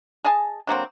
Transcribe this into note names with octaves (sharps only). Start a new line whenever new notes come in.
G#4 D#5 G#5 A5
D3 F#3 A#3 C4